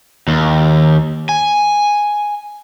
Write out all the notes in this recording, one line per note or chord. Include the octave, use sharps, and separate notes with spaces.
D#2
G#5